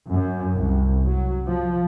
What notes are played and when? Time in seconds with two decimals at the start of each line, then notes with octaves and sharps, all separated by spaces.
0.11 F#2
0.55 C2
1.07 F#3
1.49 F3